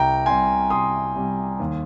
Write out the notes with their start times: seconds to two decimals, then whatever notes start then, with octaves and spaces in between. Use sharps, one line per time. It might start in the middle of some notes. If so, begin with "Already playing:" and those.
Already playing: C2 G5 A#5
0.26 C3 G3 G#5 C6
0.70 C2 C6 D#6
1.15 C3 G3
1.60 D#2